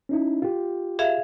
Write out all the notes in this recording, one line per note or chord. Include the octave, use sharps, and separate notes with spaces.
C#4 D#4 E4
F4 G4
G#4 E5 F5